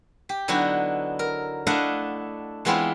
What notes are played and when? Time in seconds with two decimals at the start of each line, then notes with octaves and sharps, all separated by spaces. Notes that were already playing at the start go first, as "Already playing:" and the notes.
0.29 G4
0.48 D3 F#3 B3 D#4 E4 F#4
1.19 A#4
1.67 A3 D4 E4 D#5 F5 F#5
2.65 E3 G#3 B3 C4 E4 F4